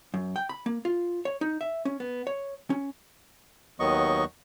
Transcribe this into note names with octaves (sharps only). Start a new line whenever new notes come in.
F#2
G5
B5
A#3
F4
C#5
D#4
E5
C#4
B3
C#5
C#4
D#2 D#3 F#3 B3 D#5 C#6